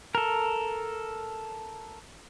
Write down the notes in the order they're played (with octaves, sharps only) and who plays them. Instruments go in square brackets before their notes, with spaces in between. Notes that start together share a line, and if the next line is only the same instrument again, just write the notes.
[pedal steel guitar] A4 A#4